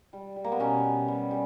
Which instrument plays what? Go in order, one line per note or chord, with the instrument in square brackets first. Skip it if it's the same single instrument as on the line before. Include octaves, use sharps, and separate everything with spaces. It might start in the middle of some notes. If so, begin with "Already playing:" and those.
[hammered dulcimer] G3
G3
A#3
B3
B2 C#4
B2
G3
G3